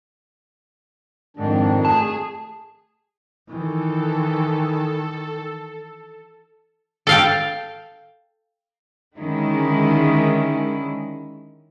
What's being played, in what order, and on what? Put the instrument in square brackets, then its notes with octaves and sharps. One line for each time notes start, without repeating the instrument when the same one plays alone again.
[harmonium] F2 D#3 D4 [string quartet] G#2
[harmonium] A3 [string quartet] G#4 [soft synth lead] A5
[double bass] D#3 E3 [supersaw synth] A4
[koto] A4 F5 G5
[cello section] D3 D#3 G#3 C#4 E4